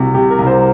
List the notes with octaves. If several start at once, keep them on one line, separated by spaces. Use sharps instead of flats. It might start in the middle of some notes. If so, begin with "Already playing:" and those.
Already playing: C2 C3 F#4
C3 G4
A#4
C2
C5